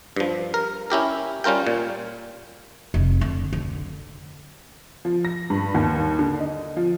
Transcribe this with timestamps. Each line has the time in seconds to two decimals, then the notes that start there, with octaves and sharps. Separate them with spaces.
0.16 G2 F3
0.54 A#4
0.90 C#4 E4 G4 A#4
1.44 G3 C#4 F4 A#4 G5
1.67 A#2
2.94 F1
3.21 D3
3.53 D3
5.05 F3
5.25 A#6
5.50 G2
5.74 D#2
6.19 D3
6.40 D#5
6.77 F3